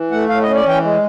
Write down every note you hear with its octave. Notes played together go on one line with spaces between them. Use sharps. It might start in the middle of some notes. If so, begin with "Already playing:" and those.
Already playing: E3
A3 F#5
A2 F5
D#5
C#4
D5
E3 G5
G#3